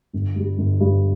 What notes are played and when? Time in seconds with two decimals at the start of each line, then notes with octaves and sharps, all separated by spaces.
0.13 G1
0.35 G2 G3
0.58 G1
0.80 G2 G3